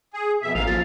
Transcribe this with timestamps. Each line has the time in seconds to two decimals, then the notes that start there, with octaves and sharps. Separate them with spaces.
0.13 G#4
0.42 F2 B2 E5
0.55 A1 A#3 A4 F5 F7
0.67 F3 F4 A6